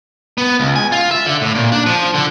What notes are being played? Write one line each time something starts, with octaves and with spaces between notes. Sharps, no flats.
B3
C#2
G#5
F4
E5
D3
A2
A#2
D4
F3
D3